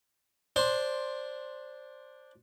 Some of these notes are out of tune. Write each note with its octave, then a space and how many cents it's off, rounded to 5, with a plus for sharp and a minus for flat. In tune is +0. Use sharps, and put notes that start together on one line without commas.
D4 +0 C5 +10 C6 +5